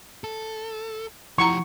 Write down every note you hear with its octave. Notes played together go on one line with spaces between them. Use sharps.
A4
F3 E4 G4 F#5 A#5 C#6